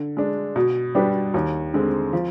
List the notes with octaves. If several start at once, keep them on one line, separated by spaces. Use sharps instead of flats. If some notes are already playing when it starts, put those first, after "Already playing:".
Already playing: D3
G#3 D4
B2
G3 D4 G4 B4
D#2
D3 G#3 C4
F3